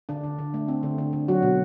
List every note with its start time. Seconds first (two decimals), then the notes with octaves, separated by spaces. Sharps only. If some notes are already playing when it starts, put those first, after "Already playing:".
0.09 D3 D4
0.24 D3
0.39 D3
0.54 A3
0.68 C4
0.83 D3
0.98 D3
1.13 D3
1.28 F#3 F#4
1.42 B2